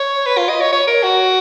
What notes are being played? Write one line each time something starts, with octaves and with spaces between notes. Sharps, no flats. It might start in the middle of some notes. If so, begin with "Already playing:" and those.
Already playing: C#5
B4
F4
D#5
C#5
C#5
A#4
F#4